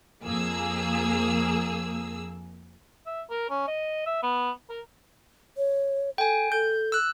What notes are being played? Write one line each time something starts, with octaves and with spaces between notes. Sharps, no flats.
F2 A#3 G#4 E6
E5
A#4
C#4
D#5
E5
B3
A#4
C#5
A4 G5 G#5
A4 G6
E6 F#6